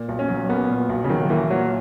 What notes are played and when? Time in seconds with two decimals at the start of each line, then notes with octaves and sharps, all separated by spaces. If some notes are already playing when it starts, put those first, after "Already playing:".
Already playing: A#2
0.09 B1
0.19 C#4
0.29 F#3
0.49 A#3 B3
0.69 A#2
0.89 B1
1.04 C#3
1.09 D#3 F#3
1.30 E3 A#3
1.50 A#2 F#3